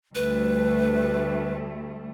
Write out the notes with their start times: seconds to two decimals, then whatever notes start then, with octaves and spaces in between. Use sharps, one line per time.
0.15 D2 G3 A3 B4